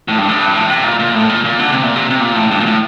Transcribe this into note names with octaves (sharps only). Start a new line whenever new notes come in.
A2
G2
A2
G2
A2
C3
A#2
A#2
A2
A#2
A#2
D3
C3
A#2
C3
C3
A#2
A2
G2
A#2
A2